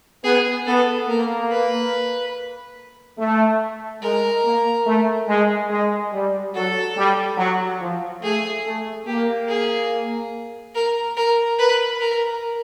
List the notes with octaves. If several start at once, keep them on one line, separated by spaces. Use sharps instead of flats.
B3 G#4
B3 A4
A#3 A#4
B4
A3
G#3 A#4
A#3
A3
G#3
G#3
G3
F#3 A4
G3
F#3
F3
A3 G#4
A3
A#3 G4
G#4
A#4
A#4
B4
A#4